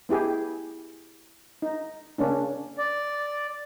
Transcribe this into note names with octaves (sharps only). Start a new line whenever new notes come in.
B3 E4 G4 G#4
D#4
C#3 A#3 C#4 D4
D5